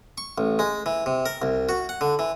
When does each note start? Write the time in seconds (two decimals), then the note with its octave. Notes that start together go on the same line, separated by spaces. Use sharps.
0.18 C#6
0.38 A1
0.59 G#3
0.86 E3
1.06 C3
1.26 A#4
1.42 C2
1.69 F#4
1.89 F#5
2.01 D3
2.19 E3